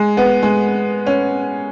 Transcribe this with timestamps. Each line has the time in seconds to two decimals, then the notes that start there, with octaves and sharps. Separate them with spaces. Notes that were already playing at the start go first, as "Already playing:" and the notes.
Already playing: G#3
0.17 B3
0.43 G#3
1.06 C#4